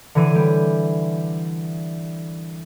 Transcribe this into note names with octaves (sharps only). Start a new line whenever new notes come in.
D3 E3 D#7
G3